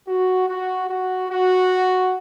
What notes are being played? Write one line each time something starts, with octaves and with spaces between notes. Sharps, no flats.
F#4
F#4
F#4
F#4